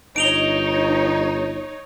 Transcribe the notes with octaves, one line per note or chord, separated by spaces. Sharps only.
G1 D#4 C#5 D7 F7 G7